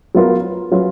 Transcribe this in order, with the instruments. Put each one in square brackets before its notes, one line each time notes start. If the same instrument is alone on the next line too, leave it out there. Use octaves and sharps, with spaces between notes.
[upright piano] F#3 B3 F4 A#4
F#3 C#4 F4 B4